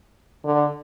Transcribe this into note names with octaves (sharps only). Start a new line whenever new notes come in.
D3